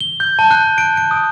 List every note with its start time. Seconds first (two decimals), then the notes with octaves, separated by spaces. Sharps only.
0.01 G7
0.20 G6
0.39 A5
0.51 F#6
0.78 D7
0.97 D7
1.11 D#6